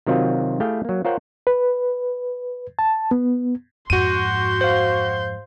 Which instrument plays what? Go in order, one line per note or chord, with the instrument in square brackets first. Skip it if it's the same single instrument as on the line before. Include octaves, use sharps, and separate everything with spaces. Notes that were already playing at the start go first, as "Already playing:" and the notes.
[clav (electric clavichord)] C3 D#3 F#3 C4 F4 F#4
A3 E4 G4 G#4 F5 G5
F#3 A#3
F4 A#4 C5 C#5 F#5 G5
[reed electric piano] B4
A5
B3
[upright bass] F2 G#2 [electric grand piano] F#4 D#7 [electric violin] C6 G6
[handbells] C5 F5